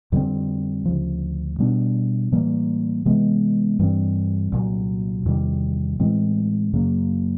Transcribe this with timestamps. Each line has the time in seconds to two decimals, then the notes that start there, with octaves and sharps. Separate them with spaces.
0.12 F2 D3 G3 C4
0.85 D2 C#3 F3
1.58 B2 G3 B3 D4
2.32 A2 E3 G3 A#3
3.05 C3 E3 G#3 B3
3.79 G2 E3 G3 C4
4.52 C2 A#2 F#3
5.26 E2 C3 D#3 G3
6.00 A2 E3 G#3 C4
6.73 F#2 C#3 F#3 A#3